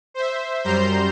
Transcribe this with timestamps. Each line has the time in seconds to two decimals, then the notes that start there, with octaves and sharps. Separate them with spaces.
0.14 C5 E5
0.64 F#2 G3 C5 A#5 C6 G6